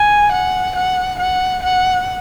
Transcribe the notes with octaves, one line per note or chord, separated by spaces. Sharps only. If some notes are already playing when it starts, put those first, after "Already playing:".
Already playing: G#5
F#5
F#5
F#5
F#5